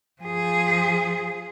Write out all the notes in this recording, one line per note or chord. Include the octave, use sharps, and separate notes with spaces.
F3 G#4